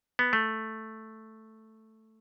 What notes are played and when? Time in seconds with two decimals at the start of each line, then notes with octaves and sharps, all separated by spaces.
0.19 B3
0.33 A3